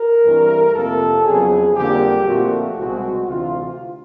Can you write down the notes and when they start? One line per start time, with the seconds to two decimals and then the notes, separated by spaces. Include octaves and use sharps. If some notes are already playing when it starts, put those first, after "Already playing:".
Already playing: A#4
0.25 G2 E3 A3 C4
0.76 F2 C3 F3 A#3 A4
1.26 F2 C#3 F#3 B3 G#4
1.76 F2 D3 G3 A#3 G4
2.27 A#2 F3 A3 C4 F#4
2.77 C2 B2 G#3 C4 F#4
3.27 D2 C3 E3 F4